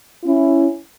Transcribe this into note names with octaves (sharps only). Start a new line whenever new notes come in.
C#4 E4